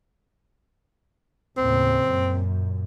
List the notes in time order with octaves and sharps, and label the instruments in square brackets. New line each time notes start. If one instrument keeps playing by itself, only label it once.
[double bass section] D#2 A2 C#3 [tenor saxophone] C4
[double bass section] F#2 A#2